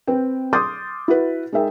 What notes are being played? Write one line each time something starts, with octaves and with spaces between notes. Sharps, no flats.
C4 B4 G5
C6 D6 D#6 F6 G6 A6
E4 F#4 B4
G#3 D#4 A#4 E5 G5